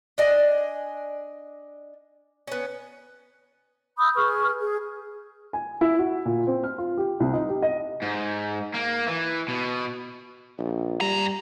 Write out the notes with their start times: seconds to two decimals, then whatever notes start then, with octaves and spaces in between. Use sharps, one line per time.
0.18 D4 D#5 G#5
2.47 B3 C#4
3.98 B5 D#6 E6 G6
4.15 G#4 B4 C#6 F6
4.60 G#4
5.53 G#5
5.81 E4
5.99 F#4
6.26 A#2
6.47 C4
6.64 F6
6.78 F4
6.98 G4
7.20 C2
7.33 D#4
7.49 G4
7.62 D#5
8.02 G#2
8.74 A#3
9.07 E3
9.48 B2
10.58 A#1
11.01 G2 G3 A#5